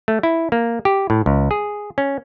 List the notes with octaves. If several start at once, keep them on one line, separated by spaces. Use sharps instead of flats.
A3
E4
A#3
G4
A2
C#2
G#4
C#4